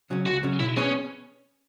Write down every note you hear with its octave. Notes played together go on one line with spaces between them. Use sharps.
C#3 F#3 C#4
C#2 F#4
C#3 F#3 C#4
B2 E4
B3 C#4 G#4 C#5